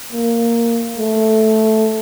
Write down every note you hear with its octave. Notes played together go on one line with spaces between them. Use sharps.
A#3
A3